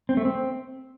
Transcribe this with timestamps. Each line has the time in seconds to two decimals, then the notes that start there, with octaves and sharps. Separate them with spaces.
0.09 C4
0.17 A3
0.25 C4